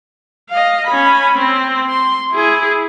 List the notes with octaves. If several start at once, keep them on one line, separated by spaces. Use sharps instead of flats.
D#5 F5
C#4 B5
C4
C6
E4 G#4